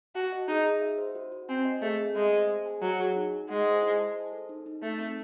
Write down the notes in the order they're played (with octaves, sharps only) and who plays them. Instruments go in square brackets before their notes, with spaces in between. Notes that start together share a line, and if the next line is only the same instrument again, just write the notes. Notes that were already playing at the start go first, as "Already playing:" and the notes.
[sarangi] F#4 [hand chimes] A5
[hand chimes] D#5
[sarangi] D#4 [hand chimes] G#4
[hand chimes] G#4
E5
C5
F#4
F#4
[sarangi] C4 [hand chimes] G#5
[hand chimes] D#5
[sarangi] A3 [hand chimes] G#4
[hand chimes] G#4
[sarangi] G#3 [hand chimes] E5
[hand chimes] C5
G#4
G#5
[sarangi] F#3 [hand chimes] C#5
[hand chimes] G#4
D#4
D#4
[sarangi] G#3 [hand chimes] F#5
[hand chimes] C5
E4
A5
C5
A4
D#4
D#4
[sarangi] A3 [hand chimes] D#4
[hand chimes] C4